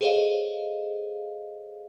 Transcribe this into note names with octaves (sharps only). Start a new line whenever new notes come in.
G#4 A4 C5 C#5 D#5 F5